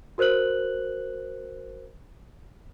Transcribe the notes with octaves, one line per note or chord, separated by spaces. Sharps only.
F#4 A#4 C5 F#6 F#7